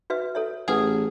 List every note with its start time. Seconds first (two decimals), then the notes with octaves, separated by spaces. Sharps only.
0.10 F#4 B4 E5
0.35 A4 C#5 E5
0.68 A1 G#4 B4 F#5